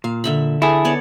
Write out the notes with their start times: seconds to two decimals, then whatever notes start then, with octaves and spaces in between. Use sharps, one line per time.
0.04 A#2 F5
0.24 D3 E5 B5
0.62 E4 G#4 A4
0.85 B3 C#5 D5